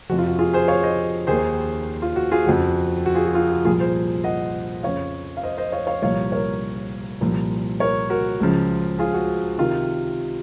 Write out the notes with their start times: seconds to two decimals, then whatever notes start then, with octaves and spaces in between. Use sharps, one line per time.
0.09 F2 C3 F3 F#4
0.18 F4
0.28 F#4
0.39 F4 G#4
0.53 G#4 C5
0.68 C#5 F5
0.83 C5 D#5
1.27 D#2 D#3 G#4 C5
2.02 F4
2.16 F#4
2.32 F4 G#4
2.46 F2 C#3 F3 F#4
3.06 F#4
3.15 F4 G#4
3.26 F#4
3.35 F4
3.51 F#4
3.65 C2 A#2 F3 F4 G#4
3.79 G#4 C5
4.24 D#5 F#5
4.83 F2 C#3 F3 C#5 F5
5.37 F5
5.43 C5 D#5
5.58 C5 D#5
5.72 C#5 F5
5.87 C#5 F5
6.02 C2 A#2 F3 C#5 F5
6.32 A#4 C#5
7.21 C2 A#2 F3
7.80 A#4 C#5
8.10 F#4 A#4
8.40 C#2 C#3 F3
8.99 F4 G#4
9.14 F#4
9.58 C3 D#3 F4